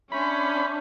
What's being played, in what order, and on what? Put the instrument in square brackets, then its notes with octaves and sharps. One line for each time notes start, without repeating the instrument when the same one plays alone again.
[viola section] C#4 [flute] D4 [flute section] E5 C6 G6 [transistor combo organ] B5